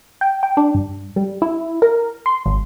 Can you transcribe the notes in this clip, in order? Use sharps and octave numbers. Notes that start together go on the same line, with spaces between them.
G5
G5
D4
G2
G3
E4
A#4
C6
G#1